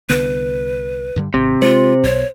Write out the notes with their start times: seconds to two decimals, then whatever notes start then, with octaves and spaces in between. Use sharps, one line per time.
0.10 C2 D3 B3 B4
1.16 G2 D3 G3
1.34 G#1 C3
1.62 G#3 F4 C5
2.04 B1 B2 C#5